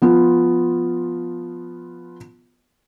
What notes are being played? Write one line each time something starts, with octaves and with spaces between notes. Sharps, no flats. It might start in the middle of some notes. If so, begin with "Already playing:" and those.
F3 B3 F4